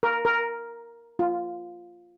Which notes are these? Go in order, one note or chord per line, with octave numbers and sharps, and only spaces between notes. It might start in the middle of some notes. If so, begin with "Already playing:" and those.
A#4
A#4
F4